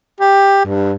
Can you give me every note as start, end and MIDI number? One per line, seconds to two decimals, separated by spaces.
0.21 0.65 67
0.66 0.94 43